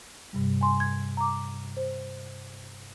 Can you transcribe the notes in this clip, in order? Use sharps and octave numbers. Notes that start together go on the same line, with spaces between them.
G2 C3 G3
G#5 C6
G#6
A#5 D6
C5